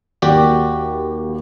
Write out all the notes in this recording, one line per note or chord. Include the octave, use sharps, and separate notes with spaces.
D#2 F#4 G4 D5